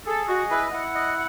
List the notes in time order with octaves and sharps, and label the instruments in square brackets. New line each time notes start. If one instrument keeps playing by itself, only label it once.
[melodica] G#4 [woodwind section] A4
[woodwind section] F#4 [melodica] D#5
[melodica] E4 [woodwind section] B4
[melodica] E4 [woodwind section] F#5
[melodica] D#5